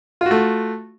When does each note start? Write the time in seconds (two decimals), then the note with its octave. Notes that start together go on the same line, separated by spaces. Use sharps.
0.21 F4
0.26 F#4
0.31 A3